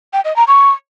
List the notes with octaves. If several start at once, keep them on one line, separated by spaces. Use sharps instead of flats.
G5
D#5
A#5
C#6